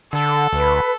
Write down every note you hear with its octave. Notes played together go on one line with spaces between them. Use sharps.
D3 A4
D2 B4